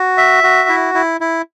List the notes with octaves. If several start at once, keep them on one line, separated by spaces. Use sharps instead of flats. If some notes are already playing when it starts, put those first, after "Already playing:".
Already playing: F#4
E5
F#4
E4
E4
E4